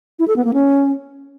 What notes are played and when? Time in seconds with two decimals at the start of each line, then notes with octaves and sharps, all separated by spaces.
0.19 E4
0.28 A4
0.36 B3
0.45 A#3
0.54 C#4